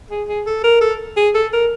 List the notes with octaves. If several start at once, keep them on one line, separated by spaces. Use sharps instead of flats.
G#4
G#4
A4
A#4
A4
G#4
A4
A#4